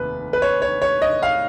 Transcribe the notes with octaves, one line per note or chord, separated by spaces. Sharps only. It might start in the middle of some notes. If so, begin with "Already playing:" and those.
Already playing: F1 D#2 B4
B4
C#5
C#5
C#5
D#5
F5